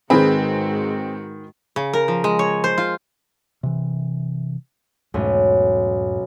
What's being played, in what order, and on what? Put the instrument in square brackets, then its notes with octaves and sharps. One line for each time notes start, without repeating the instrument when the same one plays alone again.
[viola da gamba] G#2 G#3 F#4 [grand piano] D#3 B4 B5 [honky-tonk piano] C4 [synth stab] G#4
[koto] C#3
A#4
F3
G#3
C#5
C5
F4
[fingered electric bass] C3 E3
[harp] B1 A3 C#4 [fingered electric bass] E2 G#2